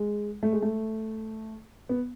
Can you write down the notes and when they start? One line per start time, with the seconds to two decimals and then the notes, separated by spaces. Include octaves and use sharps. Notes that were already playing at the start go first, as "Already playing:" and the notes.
Already playing: G#3
0.43 A3
0.52 G#3
0.62 A3
1.89 B3